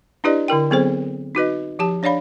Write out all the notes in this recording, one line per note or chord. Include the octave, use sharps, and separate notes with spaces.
D4 E4 G4 B4 D5 D#5
D3 E4 A#4 G5
F#3 B3 C4 G#4 A4 C5
D#4 F#4 B4 D#5
F3 G4 A5
D4 C#5 D5 F5 B5